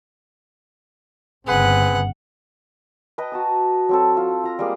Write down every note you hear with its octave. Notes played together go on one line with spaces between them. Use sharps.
G1 C#3 C4 G#4 B4 F#5
B4 D#5 G5 A#5
F#4 A5 D#6
F#3 C4 A4
F4
F4 A#5
G3 G#3 A#3 G#4